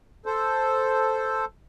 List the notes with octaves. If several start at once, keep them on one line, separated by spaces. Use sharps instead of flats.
A4 C5